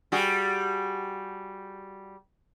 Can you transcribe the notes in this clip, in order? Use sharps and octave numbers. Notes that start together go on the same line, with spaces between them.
G3 F#4 G#4